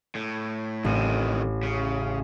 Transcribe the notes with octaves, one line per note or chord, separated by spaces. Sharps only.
A2
A1 F2 D#3
C#3